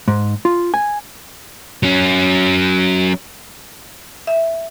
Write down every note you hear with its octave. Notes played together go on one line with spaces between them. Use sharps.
G#2
F4
G#5
F#3 C#4
E5